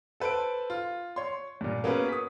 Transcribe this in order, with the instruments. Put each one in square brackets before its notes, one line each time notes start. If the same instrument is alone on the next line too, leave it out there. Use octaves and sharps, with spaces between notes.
[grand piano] A4 B4 C5 A5 D7
F4
C#5 C6
G2 A#2
A#3 B3 C#4 F#4 G#4 B4
D#6 B6